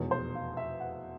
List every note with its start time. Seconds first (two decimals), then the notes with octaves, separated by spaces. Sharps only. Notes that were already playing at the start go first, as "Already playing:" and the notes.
Already playing: F1 E2 B2 G#3 C#5
0.11 C5
0.35 F5
0.57 E5
0.80 F#5